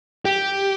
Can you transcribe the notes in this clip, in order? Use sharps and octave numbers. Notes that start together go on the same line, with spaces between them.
G4